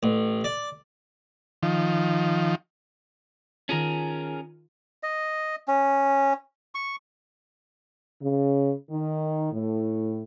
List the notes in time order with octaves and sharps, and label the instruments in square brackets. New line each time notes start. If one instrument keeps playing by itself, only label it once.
[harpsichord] A1
D5
[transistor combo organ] D#3 F3
[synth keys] D#3 F4 [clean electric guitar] C#4 G#4 A#4
[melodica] D#5
C#4
C#6
[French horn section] C#3
D#3
A2